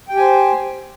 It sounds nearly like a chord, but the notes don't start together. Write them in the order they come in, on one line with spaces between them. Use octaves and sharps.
G5 G4 G#5 C5